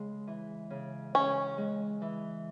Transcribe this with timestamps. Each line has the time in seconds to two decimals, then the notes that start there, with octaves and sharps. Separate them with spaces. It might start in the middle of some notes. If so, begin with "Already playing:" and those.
Already playing: C#3 G#3
0.27 E3
0.70 C#3
1.15 C#3 C#4
1.58 G#3
2.02 E3